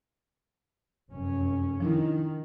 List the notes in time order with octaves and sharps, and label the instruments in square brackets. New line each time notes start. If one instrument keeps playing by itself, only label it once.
[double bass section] F1 F#2 C#4
[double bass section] D#3 [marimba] F3 D4 E4